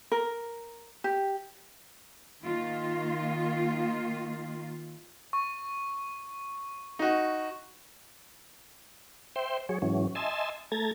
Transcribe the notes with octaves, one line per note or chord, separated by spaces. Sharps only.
A#4
G4
D#3 A#3 F4
C#6
D#4 F#4
C5 E5 G5 C6
F#3 G#4 C#5
G#2 E3 F#3 C#4
D#5 E5 G#5 A5 C6 E6
A3 A4 A#5 G#6 A6